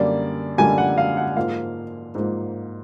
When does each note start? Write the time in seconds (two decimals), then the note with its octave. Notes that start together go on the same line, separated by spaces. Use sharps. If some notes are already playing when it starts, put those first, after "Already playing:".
Already playing: F#2 D3 G3 A#3 D5
0.58 F#2 D3 G3 A#3 G#5
0.78 F#5
0.98 F5
1.17 F#5
1.37 G#2 F3 A#3 F5
2.15 G#2 F3 A#3